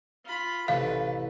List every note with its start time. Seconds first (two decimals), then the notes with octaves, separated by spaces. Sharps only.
0.25 F4 B5
0.68 A1 C3 A4 B4 F5